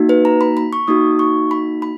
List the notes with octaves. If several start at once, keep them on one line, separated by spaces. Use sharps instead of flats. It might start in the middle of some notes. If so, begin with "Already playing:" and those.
Already playing: A#3 D#4 F#4
B4
A#5
B5
B5
C#6
A#3 D#4 F#4 D#6
C#6
B5
B5